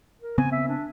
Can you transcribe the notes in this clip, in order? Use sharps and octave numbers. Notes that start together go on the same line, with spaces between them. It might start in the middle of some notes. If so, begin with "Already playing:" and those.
A#4
C#3 B3 C4 G#5
E5
D4